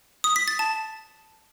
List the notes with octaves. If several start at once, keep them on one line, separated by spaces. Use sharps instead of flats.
D#6
B6
A6
A5